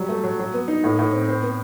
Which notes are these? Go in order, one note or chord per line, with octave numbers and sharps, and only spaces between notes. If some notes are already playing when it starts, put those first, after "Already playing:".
Already playing: F#3 G3
A3
F#3
F#3
B3
D#4
A2
A2
C4
C5
B3